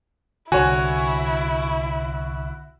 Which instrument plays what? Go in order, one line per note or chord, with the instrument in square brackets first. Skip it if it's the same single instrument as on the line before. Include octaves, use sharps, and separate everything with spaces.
[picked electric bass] C2 D3 [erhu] E4 [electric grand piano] F#4 [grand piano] C#5 G#5